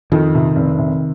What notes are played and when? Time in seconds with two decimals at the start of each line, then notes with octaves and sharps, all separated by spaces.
0.12 F2 D#3
0.35 C3
0.56 F1
0.79 C3